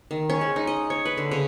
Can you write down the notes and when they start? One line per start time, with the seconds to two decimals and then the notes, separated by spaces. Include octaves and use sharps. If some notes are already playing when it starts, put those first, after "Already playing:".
0.11 D#3
0.30 C#4
0.41 G#3
0.56 D#4
0.67 D#5
0.90 C#5
1.05 B4
1.17 D3
1.31 C#3